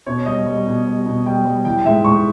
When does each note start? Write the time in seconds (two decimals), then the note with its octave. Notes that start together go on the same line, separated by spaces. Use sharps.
0.06 B2 C#5
0.26 G3 D#5
0.46 G3
0.66 B2
0.87 G3
1.06 B2
1.26 G3 G5
1.45 G3
1.65 E3 G5
1.85 G#2 E5
2.05 G#2 C#6